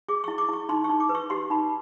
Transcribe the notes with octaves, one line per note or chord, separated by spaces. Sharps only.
G#4 D6
C#6
E4
D6
E4 C#6
D#4 C6
C#6
D#4
D6
B4
C#6
G4 C6
D#4 B5